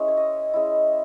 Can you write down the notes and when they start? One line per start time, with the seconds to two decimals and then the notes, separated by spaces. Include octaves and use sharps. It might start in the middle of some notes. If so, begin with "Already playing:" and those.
Already playing: G#3 C#4 E4
0.08 C#5
0.17 D#5
0.54 G#3 C#4 E4